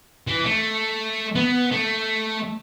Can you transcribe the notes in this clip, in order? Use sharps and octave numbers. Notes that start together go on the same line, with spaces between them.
E3
A3
B3
A3